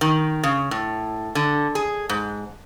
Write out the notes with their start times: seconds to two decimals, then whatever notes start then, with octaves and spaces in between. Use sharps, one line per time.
0.01 D#3
0.43 C#3
0.71 A2
1.35 D3
1.75 G#4
2.09 G#2